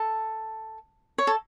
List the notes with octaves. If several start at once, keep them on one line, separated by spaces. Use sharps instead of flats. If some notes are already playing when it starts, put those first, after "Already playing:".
Already playing: A4
C#5
A4